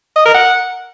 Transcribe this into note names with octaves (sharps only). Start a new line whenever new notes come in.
D#5
A#4
F#5